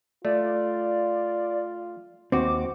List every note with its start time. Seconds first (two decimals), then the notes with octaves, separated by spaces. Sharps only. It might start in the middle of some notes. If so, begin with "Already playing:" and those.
0.25 A3 F4 D5
2.32 D#2 C4 F#4 D6